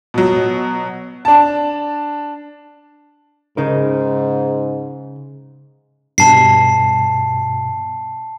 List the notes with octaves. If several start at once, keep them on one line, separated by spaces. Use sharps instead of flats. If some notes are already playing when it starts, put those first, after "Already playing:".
B2 F#3
D4 A5
G#2 C#3 D#4 A#4
G2 B2 A5 C7